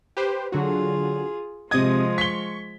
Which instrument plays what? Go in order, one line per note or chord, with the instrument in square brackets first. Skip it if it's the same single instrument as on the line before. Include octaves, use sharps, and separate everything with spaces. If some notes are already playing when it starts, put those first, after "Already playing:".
[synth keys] G4 B4 C5
[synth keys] D3 F#3 F#4 [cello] F4 G#4
[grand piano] C3 G#6 [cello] F3 G#3 [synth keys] D#5 D#6
[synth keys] C#6 [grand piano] B6 G7